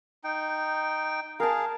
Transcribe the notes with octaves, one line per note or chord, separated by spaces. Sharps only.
D#4 G5
G#4 A#4 F5 A5